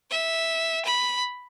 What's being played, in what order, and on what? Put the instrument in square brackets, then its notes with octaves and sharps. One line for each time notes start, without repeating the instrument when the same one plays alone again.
[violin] E5
B5